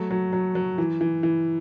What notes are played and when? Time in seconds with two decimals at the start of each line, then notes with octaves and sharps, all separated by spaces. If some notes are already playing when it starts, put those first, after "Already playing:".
Already playing: F#3 A3
0.11 F#3
0.33 F#3
0.55 F#3
0.78 E3
1.01 E3
1.23 E3